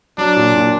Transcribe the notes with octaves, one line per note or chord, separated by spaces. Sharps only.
F#3 D4
A#2
A#2